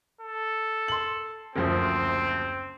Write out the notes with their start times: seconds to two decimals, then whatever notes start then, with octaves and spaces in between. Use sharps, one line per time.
0.21 A4
0.88 C6 F#7
1.56 F#1 D2 F3 C4